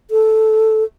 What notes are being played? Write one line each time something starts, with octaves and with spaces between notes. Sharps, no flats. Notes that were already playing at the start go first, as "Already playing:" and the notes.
A4